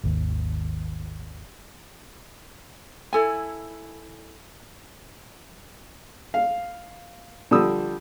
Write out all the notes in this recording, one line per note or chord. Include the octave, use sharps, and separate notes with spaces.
G#1 D#2
E4 A4 G#5
F5
D3 F3 G3 D#6 E6